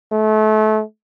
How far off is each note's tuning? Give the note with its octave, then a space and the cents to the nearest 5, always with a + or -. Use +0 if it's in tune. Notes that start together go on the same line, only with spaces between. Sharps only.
A3 -30